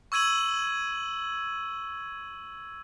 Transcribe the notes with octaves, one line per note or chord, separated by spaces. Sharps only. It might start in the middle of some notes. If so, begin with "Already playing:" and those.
C#6 E6 G#6 D#7 F#7